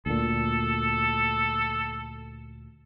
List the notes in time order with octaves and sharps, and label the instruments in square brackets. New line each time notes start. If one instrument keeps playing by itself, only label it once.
[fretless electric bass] D2 A#2 [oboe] A4